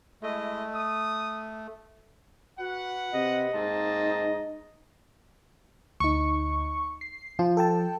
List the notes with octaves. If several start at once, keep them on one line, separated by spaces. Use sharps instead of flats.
G#3 A3 E4 D#5
D#6
F#4 B4 F#5
C3 C4 D#5
G#2 A#3 C4 D#4 A5
D2 D#4 C#6
C7
F3 F4
A4 G5 A5